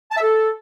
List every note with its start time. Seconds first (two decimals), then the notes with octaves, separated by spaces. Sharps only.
0.11 A5
0.16 E5
0.22 A4